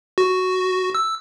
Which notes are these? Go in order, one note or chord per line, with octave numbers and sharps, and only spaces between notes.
F#4
E6